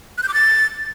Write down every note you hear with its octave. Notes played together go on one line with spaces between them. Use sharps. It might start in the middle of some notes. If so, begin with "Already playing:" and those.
F#6
G6
D6
A6